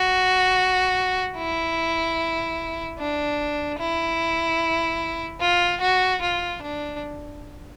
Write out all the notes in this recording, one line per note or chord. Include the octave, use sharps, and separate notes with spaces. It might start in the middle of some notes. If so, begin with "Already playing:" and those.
Already playing: F#4
E4
D4
E4
F4
F#4
F4
D4